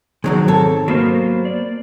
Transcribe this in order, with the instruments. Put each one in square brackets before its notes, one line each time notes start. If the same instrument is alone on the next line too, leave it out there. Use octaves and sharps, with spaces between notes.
[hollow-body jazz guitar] B1 F#3 G#3 [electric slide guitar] D#3 C4
[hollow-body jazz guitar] G#2 A4 C#5
[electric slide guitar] F#3 A#3 C5 [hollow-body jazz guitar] B3
[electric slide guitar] D5